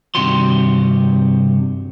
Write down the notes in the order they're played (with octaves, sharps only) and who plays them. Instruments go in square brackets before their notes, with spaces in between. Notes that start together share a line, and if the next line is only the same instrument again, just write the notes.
[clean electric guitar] G2 C3 D#3 F#4 G4 C6